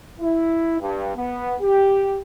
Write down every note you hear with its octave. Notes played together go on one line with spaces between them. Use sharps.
E4
G2
B3
G4